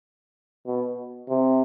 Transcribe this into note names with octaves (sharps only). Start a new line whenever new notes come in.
B2
C3